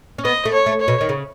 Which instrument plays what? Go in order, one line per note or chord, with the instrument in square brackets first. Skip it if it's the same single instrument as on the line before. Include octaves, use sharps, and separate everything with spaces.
[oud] C#4
[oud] B3 [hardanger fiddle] D#5
[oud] A3
[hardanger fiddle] C#5
[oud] A3
[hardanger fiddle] C#5
[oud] B2
D#3
C#3